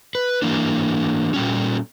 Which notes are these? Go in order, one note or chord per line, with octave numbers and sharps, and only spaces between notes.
B4
E3 A#3 D4
A#2 G3 C#4